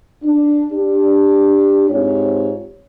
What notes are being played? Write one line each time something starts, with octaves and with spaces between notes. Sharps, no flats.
D4
D4 G4
G#2 C4 F4 G4 C#5